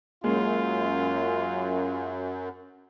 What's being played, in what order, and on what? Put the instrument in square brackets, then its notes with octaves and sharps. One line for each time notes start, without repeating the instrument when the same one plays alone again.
[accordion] F#2 [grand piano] G#3 A#3 [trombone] F4